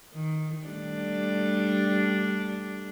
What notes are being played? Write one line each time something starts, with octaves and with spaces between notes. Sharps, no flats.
D#3
G3 A3 D4